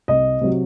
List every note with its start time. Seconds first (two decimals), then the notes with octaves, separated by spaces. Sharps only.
0.08 C2 D#5
0.41 C3 F#3